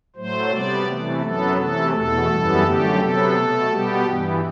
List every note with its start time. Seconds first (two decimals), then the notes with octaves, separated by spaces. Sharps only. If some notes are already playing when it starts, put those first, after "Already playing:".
0.16 A2 F#3 A3 C5
0.50 C3 G3 B3 D5
0.87 C3 E3 A3
1.22 F#2 F#3 B3 A4
1.57 C3 E3 A3 A4
1.92 E2 B2 A3 A4
2.29 F#2 E3 G3 B3
2.63 F#2 D3 A3 G4
2.99 C3 F#3 B3 A4
3.34 B2 A3
3.70 B2 G3 B3 G4
4.06 G2 E3 B3